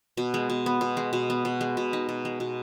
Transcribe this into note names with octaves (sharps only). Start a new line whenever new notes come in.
B2
G#3
B2
B3
B2
G#3
B2
B3
B2
G#3
B2
D#4
B2
G#3
B2